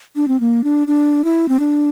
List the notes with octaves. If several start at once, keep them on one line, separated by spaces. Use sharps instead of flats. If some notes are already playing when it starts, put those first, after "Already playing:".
D4
C4
A#3
D4
D4
E4
C4
D4